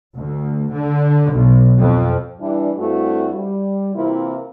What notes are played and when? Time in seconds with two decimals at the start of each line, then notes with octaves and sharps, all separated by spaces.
0.16 D2
0.73 D3
1.32 B1
1.80 F2
2.41 E3 G3 D4
2.78 G2 A3 C4 E4 F#4
3.34 G3
3.95 C3 E3 A#3 C4 E4 F4